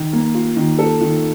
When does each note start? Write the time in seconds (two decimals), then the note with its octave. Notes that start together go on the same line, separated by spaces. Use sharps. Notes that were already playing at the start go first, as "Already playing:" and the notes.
Already playing: D#3
0.13 A#3
0.34 F4
0.57 D#3
0.79 A4
1.01 D#3